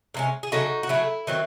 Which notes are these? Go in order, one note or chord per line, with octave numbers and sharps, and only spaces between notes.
C3 D#3 G#3 C#4
G#4
C#3 F#3 A3 D#4 F#4
F#4
C#3 F#3 A3 E4
D#3 F#3 C4